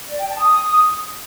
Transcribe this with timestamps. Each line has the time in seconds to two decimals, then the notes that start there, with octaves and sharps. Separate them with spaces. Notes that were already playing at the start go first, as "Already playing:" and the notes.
0.09 D5
0.18 G5
0.28 A5
0.37 D#6